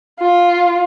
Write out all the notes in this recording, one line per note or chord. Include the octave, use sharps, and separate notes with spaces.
F4